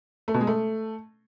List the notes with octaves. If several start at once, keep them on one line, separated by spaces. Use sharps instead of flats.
A3
B2
G#3
A3